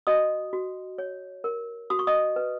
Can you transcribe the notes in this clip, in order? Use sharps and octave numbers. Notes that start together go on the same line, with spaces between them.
F#4 D#5 D#6
F#4
C#5
A#4
F#4 D#6
C#6
D#5 D#6
B4